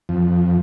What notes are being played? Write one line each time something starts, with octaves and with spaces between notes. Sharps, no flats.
F2